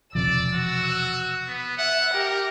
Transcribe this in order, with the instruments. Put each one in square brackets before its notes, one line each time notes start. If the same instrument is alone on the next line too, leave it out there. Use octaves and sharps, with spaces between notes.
[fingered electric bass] E1 C3 F3 [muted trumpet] D5 [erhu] E6
[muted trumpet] F#4
B3
[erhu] E5 [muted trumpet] F#5
[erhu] G4 [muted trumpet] A#4